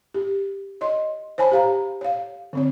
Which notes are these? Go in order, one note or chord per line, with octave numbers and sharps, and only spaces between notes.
G4
C#5 D#5 C6
C5 C#5 G#5 A5 B5
G4 F5 A#5
C#5 F5
D3 C4 C#5